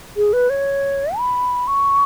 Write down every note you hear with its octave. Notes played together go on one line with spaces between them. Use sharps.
G#4
B4
C#5
B5
C#6